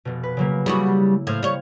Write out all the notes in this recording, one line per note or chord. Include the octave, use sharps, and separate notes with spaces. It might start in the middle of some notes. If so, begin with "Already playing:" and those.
F1 B2
B4
C#3 F#3 A#3
C#3 G3 E4 F#4
A2 C5 F5 G#6
G3 C#5